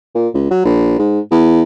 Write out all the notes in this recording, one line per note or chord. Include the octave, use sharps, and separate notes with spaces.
A#2
C#2
F#3
A#1
G#2
E2